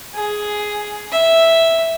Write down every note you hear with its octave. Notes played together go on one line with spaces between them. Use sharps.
G#4
E5